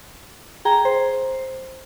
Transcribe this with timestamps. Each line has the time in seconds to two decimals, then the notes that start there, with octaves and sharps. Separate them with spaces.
0.65 G#4 G5 A#5
0.85 C5